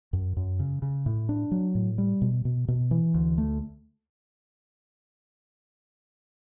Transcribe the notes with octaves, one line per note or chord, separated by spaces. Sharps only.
F#2
F#2
C#3
C#3
A2
D4
F#3
A2
G3
B2
B2
B2
E3
D2
A3